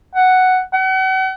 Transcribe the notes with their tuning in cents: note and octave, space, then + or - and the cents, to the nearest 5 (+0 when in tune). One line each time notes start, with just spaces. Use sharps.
F#5 +5
F#5 +40